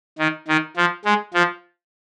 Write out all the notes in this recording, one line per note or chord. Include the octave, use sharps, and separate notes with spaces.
D#3
D#3
F3
G#3
F3